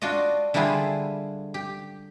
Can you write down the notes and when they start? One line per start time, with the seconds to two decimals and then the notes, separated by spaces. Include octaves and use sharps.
0.02 D4 F4 F#4 D5 D#5
0.54 D3 G3 D4 E4 F4 G#4
1.54 G4